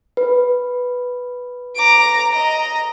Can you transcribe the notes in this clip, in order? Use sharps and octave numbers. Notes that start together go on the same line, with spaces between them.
B4
A#5 D6
D#5 A#5